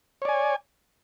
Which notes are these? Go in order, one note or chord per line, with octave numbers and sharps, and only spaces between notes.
C#5 D5 G#5